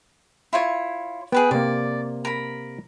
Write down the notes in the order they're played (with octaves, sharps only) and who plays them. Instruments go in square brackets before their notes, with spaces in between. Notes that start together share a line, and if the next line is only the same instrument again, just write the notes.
[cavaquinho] E4 F4 C#5
[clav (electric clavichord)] B3 [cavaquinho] G#4 B4 G5
[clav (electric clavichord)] C3 A#3 [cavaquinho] D5
[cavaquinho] A#4 B5